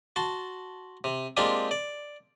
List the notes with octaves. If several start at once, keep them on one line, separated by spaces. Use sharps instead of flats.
F#4 A5 C6
C3
G#3 A#3 C4 D4 F4 G4
D5